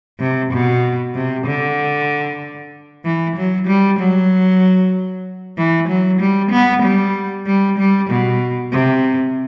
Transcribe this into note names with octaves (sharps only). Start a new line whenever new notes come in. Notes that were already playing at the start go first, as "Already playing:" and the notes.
C3
B2
C3
D3
E3
F#3
G3
F#3
E3
F#3
G3
B3
G3
G3
G3
B2
C3